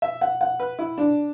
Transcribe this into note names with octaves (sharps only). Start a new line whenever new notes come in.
E5
F#5
F#5
B4
E4
D4